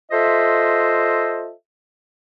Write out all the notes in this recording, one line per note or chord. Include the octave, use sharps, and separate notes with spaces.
F4 A4 C5 D#5 E5